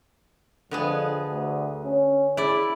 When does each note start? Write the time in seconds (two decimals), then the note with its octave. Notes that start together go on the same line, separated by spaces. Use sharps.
0.71 F2 D3 B3 G#4
1.27 D2
1.85 C#4
2.37 E4 G#4 D5